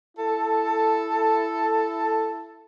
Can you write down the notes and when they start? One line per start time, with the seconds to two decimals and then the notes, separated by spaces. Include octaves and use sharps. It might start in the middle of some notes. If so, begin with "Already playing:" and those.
0.17 E4 A4